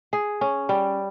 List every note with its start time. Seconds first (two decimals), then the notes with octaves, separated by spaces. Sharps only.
0.13 G#4
0.41 C#4
0.69 G3